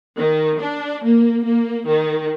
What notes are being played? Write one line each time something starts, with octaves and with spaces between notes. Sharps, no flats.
D#3
D4
A#3
A#3
D#3